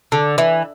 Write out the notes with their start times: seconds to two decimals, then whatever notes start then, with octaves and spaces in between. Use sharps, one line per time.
0.12 D3
0.38 E3